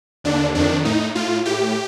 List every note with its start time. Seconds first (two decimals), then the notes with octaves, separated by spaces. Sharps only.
0.24 D#2 D3 D4
0.55 F2 D#3 D4
0.85 A2 D#4
1.15 A2 F4
1.45 A2 G4